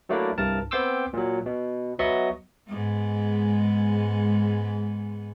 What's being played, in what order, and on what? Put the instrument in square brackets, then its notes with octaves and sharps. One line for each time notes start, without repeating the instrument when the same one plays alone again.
[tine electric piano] F#3 A3 A#3 D4 E4
C2 G2 A#4 A5
B3 C4 G5 C6 D6 E6
A#2 F#3
B2
F#3 B3 D#5 E5 C#6
[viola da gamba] G#2 G#3 B3